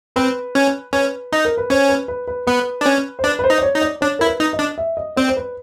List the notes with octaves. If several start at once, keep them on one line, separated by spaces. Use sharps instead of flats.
C4 B4
C#4
C#4 B4
D#4
A#4
B4
C#4 C5
B4
B4
B4
B3 B4
D4
C#4
C5
D4 B4
B4
C5
D#4
D5
C#5
D#4
D5
D4 C#5
E4 A#4
B4
D#4
D#5
D4
E5
D#5
C4 D5
C5
B4